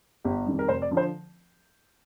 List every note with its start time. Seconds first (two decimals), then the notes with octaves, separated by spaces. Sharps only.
0.25 G1 G4
0.46 F2 D#3 G3
0.59 A#4
0.68 F1 C5
0.82 D5
0.91 D3 F3
0.97 C5